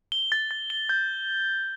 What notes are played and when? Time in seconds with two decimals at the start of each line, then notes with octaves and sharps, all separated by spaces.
0.12 G7
0.32 A6
0.51 A6
0.70 G7
0.89 G6